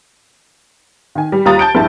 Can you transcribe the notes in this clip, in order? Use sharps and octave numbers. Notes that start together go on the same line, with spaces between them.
D#3 G#5
G3
D#2 G3 F4 A#5 D#6 A6
A5 G6 D7
A#1 G2 E4 A5